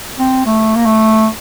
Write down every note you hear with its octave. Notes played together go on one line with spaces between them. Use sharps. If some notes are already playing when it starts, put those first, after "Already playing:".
C4
A3
A#3
A3